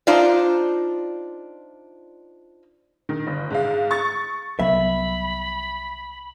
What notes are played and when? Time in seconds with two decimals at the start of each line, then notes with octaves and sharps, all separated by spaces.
0.07 D4 D#4 F4 C5 D5
3.09 D#3
3.27 G1
3.51 G#2 F5
3.91 C#6 A6
4.59 C2 F#3 B3 E5 B5